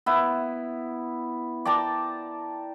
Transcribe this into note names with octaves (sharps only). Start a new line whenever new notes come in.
B3 E4
D5 G5 A5 A#5